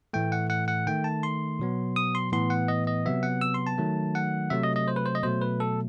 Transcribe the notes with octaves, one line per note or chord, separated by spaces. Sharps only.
A2 E3 A3 G5
F#5
F#5
F#5
D#3 A3 G5
A5
C6
B2 F#3 B3
D#6
C6
A2 E3 B3 C6
F#5
D#5
D#5
C3 F#3 B3 E5
F#5
E6
C6
A5
D#3 F#3 A3
F#5
C3 F#3 A3 E5
D#5
D#5
C5
B4
C5
D#5
B2 F#3 A3 C5
B4
A4